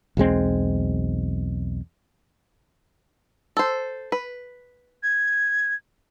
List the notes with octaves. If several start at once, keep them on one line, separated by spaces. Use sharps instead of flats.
B1 E2 G#3 C4
A4 C5
B4
G#6